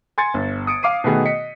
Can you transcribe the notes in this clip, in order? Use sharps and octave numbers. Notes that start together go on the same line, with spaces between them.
G#5 C6 G#6 A6 C#7
G1
D#6 C#7 D7
F5 D6 C7 D#7
B2 D#3 A3 B3 F#4 G#4
D#5 B6 C#7